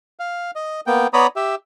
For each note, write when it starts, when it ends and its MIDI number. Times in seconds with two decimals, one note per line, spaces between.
0.19 0.51 77
0.56 0.81 75
0.87 1.07 58
0.87 1.07 59
0.87 1.07 79
1.13 1.27 59
1.13 1.27 73
1.13 1.27 74
1.13 1.27 82
1.13 1.27 83
1.13 1.27 87
1.36 1.55 67
1.36 1.55 76